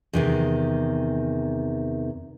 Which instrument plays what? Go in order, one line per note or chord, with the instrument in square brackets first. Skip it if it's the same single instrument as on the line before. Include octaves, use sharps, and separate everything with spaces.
[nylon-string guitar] E2 C3 D#3